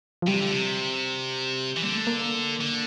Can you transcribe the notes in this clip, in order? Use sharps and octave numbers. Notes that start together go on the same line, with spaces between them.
F3
C3 G3
D3
C3
E3
D3 A#3
A3
A#3
D3